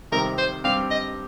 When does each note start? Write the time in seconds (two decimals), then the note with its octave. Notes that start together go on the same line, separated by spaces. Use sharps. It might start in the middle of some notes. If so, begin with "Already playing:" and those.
0.12 F2 C3 D#3 G3 C4 A#4
0.38 C5
0.64 G2 G3 C4 G4 F5
0.91 D#5